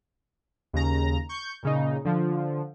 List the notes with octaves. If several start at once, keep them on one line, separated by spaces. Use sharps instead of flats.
D#2 C#3 A#5
C#6 G6
A#2 C#3 D#4
D3 F3